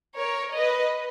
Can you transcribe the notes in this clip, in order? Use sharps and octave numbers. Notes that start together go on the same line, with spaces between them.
A#4 C#5
B4 D#5